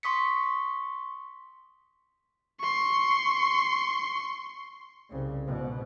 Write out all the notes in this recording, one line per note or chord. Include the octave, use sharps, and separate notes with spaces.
C6 C#6 D#6 B6 C#7
C6 C#6
C2 C#3
G#2 B2